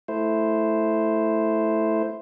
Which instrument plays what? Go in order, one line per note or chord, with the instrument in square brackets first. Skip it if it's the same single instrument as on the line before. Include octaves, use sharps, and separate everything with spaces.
[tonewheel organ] A3 E4 C5